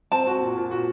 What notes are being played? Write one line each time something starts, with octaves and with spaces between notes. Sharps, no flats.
C4 A5
F#4
A#2
A#2
F#4